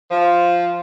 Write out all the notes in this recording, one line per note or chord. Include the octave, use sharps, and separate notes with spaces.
F3